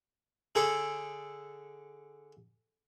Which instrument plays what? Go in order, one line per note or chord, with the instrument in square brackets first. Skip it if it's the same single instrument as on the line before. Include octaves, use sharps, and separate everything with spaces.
[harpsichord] D3 G#4 A4